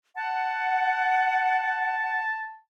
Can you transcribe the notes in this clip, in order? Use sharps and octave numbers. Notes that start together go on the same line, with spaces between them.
F#5 A5